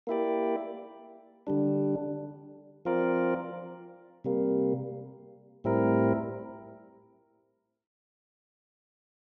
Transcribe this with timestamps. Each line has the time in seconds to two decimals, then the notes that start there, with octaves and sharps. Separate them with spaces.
0.07 A#3 E4 G4 D5
1.47 D3 G3 D4
2.85 F3 C4 F4 A#4 D5
4.24 C3 G3 A#3
5.64 A2 G3 C4 E4 A#4